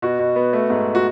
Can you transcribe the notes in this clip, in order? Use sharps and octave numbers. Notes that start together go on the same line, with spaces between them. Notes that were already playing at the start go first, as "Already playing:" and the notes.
B2 F#4
B2
B3
A3
G#2
F#4